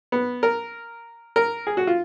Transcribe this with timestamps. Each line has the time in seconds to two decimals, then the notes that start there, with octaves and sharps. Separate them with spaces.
0.12 B3
0.43 A#4
1.36 A#4
1.67 G#4
1.77 F#4
1.87 F4